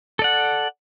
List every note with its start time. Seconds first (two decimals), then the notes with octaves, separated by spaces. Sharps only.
0.19 A4
0.22 D5
0.24 F#5